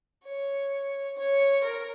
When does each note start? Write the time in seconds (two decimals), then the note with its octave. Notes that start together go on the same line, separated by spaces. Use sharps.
0.24 C#5
1.16 C#5
1.64 A#4